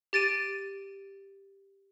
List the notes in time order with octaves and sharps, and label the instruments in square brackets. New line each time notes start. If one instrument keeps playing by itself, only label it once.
[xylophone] G4 A6 D7 D#7